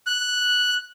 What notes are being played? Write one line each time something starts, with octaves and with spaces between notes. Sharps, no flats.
F#6